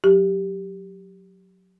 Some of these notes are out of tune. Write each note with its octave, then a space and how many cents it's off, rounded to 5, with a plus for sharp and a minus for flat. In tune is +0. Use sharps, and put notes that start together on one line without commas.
F#3 -15 G4 +0